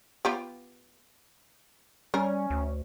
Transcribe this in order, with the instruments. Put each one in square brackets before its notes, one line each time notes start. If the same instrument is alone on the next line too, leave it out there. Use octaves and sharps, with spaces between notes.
[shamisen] B3 F4 G4
[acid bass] G3 [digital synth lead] C#4 [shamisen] A#4
[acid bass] D2